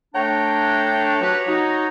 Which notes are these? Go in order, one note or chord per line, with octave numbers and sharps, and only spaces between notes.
A3 D4 C#5 G5 A#5
F#3 G4 B4
D#4 F#4